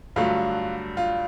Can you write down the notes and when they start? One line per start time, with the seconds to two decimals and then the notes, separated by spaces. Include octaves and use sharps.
0.16 G2 D3 F#3 A3 F4
0.97 F4